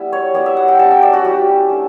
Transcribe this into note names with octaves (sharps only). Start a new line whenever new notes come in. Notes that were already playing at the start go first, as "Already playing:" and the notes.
Already playing: G3 B3 E4
C#5
G3 B3 E4 D5
E5
F#5
G5
G3 C#4 E4 A5
G5
D5
F#4
G3 C#4 E4 G4
A3 D4